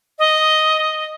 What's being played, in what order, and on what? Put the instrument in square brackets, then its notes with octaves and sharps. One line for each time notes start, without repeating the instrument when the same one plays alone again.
[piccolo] D#5